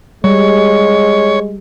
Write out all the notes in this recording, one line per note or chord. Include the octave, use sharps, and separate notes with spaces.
G3 G#3 C#5